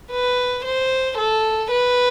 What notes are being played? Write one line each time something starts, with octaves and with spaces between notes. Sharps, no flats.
B4
C5
A4
B4